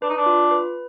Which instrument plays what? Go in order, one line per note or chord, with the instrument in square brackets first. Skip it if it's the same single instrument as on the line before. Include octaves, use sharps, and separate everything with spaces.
[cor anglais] D4 [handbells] B4
[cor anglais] D#4
D4
[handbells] F4
B4